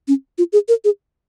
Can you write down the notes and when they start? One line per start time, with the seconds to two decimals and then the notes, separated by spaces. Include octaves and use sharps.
0.08 C#4
0.38 F4
0.53 G#4
0.68 A#4
0.84 G#4